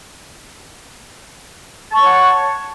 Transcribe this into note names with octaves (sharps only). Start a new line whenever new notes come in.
C#5 F#5 A5 C#6